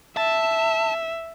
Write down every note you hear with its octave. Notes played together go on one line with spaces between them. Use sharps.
E5 A5